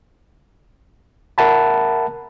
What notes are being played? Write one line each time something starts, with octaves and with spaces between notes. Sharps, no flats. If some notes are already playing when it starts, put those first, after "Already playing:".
A#4 E5 F#5 A5 B5